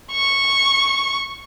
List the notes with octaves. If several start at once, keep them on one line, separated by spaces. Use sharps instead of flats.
C#6